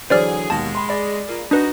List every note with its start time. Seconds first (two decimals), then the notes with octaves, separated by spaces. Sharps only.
0.10 D3 E3 F#3 G#4 C5 D5 F6
0.50 D#2 B2 D#3 G#3 A5
0.75 B5 C6
0.89 G#4 D5 B5
1.29 A#3 F4
1.51 D4 D#4 F#4 B4